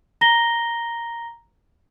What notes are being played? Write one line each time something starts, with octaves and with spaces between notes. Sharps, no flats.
A#5 A#6 G7